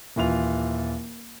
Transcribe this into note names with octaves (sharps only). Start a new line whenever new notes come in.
D#1 E3 F4 F7